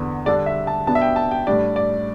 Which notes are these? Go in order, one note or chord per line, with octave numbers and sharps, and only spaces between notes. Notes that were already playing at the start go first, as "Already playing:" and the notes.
Already playing: E2 D3 B3
D3 G3 D4 D5
E5
A5
B2 B3 D4 A5
E5
G5
A5
G5
A2 G3 D4 D5
D5